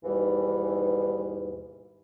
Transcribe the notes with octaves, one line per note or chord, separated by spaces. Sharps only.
D#2 G#2 B2 E3 G3